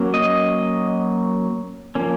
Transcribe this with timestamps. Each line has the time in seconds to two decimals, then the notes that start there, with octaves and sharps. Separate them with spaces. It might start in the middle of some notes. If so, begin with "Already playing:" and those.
Already playing: F#3 A#3 C#4
0.14 D#5
1.95 F3 A#3 C#4